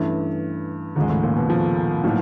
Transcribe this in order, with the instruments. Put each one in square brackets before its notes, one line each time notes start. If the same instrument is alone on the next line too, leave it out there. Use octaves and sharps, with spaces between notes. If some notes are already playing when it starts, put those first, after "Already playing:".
Already playing: [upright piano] G2 [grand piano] E3 A3 C#4 E4
[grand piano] D#2 C#3 F3 G#3 [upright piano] G#2
[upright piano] A2
A#2
B2
F3
[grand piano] A2 F#3 A#3 D#4 F#4